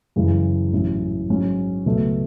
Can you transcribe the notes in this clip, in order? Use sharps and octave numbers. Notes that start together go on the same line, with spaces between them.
F#2 C#3 E3 G#3
A1 G#2 F#3 C#4 E4
G#2 F#3 C#4
C#2 B2 F#3 A3